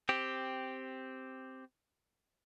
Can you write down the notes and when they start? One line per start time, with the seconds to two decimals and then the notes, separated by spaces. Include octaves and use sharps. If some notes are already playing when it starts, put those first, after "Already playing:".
0.09 C4 G4